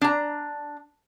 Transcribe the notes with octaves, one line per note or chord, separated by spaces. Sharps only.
D4 A#5